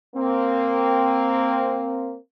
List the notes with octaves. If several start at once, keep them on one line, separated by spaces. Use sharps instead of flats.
A#3 C4